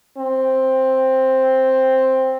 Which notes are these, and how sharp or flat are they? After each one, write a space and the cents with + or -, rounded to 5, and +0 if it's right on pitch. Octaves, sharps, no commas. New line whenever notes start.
C4 +5